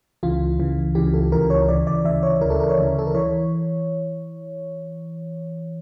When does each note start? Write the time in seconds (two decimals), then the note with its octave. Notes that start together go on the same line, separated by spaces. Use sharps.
0.23 C#2 C#3 E3 F4
0.59 C#2 C#3 E3
0.95 C#2 C#3 E3 G4
1.14 A4
1.32 C#2 C#3 E3 A#4
1.50 C#5
1.69 D2 C#3 E3 D5
1.87 D5
2.05 D2 C#3 E3 E5
2.23 C#5
2.41 D2 C#3 E3 A#4
2.50 A4
2.60 A#4
2.69 C#5
2.78 D2 C#3 E3
2.99 A4
3.07 A#4
3.15 E3 C#5